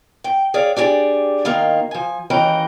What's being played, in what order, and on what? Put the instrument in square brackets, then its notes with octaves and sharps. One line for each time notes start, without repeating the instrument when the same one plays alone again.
[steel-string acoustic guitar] G5
G#4 C#5 D5 F5
D4 G4 G#4 D5
D#3 A#3 D#4 F4
F3 G#5
D#2 E3 C#4 D#5 G5 A#5